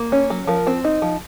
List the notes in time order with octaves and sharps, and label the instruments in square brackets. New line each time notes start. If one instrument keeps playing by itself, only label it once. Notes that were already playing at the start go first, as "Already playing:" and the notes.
Already playing: [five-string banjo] A#3
C#4
F#3
F3 A#4
C4
D#4
F3